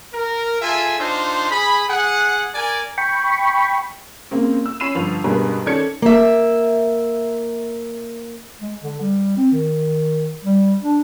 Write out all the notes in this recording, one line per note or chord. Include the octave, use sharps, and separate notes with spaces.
A#4
F4 G#4 A4 E5 G#5
D4 D#4 F4 C5
G#4 B5
G#4 F#5
A#4 D5 G#5
G5 B5 C#6
C#3 A#3 C4
E6
C#4 B5 C7 D#7 E7
G1 F3 F7
C#2 G2 B2 G#4 A#4 B4
D#3 C#4 A4 D5 G#6 C#7
A#3 E5
G#3
D3
G3
C4
D#3
G3
D4